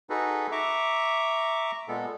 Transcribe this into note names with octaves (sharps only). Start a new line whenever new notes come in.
D#4 F#4 G#4 A4 B4
E5 A#5 C#6 D6
A#2 G#3 B3 A4